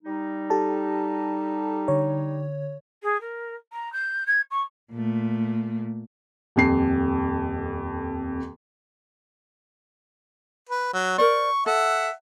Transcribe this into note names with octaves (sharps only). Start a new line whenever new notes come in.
G3 D#4
G4 A4 A5
D3 C#5
G#4
A#4
A#5
G6
G#6
C#6
A#2 A3
D#1 F2 C7
B4
F#3
A#4 C5 D5 C#6
A4 E5 F#5